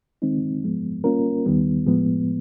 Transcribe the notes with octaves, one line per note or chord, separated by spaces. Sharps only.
D#3 G#3 C4 D#4
G#2 F3 G#3 B3
G3 A#3 C#4 F4 A#4
D#2 D#3 G3 B3
A2 F3 G#3 B3